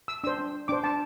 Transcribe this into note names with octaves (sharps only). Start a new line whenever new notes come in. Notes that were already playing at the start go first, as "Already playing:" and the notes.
E6
D4 C5 E6
D4 C5 D6
A5